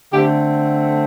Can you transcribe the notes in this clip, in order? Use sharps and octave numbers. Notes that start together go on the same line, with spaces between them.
D3 A3 C4 G4